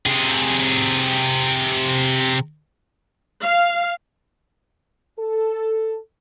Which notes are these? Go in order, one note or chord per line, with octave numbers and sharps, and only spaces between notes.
C3 G#4
F5
A4